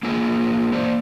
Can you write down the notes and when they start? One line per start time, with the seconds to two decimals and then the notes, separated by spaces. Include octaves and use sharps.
0.03 A#3 D4 F4 G#4 G#5
0.72 A#3 C5 D5